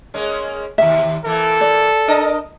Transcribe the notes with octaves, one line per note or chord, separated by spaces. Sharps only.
G#3 A#3 C#4
D#2 C3 E5
E3 A#3 A4
D5
D4 A#4 D#5